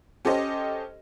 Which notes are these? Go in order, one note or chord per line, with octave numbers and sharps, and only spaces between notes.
C#4 G4 A4 C5 D#5